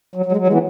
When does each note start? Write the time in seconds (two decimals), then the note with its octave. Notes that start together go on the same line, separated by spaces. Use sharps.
0.15 F#3
0.26 F#3
0.32 G#3
0.36 F#3
0.47 E3 G#3
0.53 B3